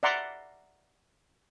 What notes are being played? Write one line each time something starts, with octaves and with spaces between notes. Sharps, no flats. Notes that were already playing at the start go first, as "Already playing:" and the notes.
D5 E5 F#5 A#5 C6 D6